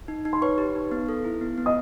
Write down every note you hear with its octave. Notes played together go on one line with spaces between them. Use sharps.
D#4
D#4
C6
B4 C#5 C#6
G4
D#4
B3
A4
E4
B3
B3
D#5 D#6